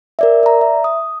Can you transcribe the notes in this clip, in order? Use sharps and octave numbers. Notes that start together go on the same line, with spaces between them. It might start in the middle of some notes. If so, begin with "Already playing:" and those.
A#4 D5 E5
D5 A#5
E5
D#6